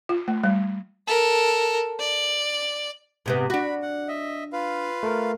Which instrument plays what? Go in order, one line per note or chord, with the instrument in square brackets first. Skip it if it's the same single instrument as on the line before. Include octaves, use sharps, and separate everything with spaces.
[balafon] F4
A3
G3
[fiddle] A4 A#4
D5
[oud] G#2 C3 B3
[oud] D4 F#4 [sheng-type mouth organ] B5
[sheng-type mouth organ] F#5
D#5 E5
F4 B4 F5
[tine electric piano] A3 A#4